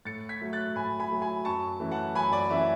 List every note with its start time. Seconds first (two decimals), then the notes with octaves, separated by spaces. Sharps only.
0.05 A2 A6 C#7
0.29 G#6 B6
0.41 F#3 A3
0.53 F#6 A6
0.76 A2 G#5 B5
1.00 G#5 B5
1.11 F#3 A3
1.22 G#5 B5
1.45 F#2 A5 C#6
1.80 E3 A3 C#4 E4
1.92 F#5 A5
2.15 F#2 G#5 B5
2.33 D5
2.50 E3 A3 C#4 E4 E5